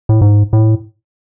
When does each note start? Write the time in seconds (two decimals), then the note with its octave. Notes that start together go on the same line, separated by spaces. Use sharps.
0.09 A2
0.21 G#2
0.53 A2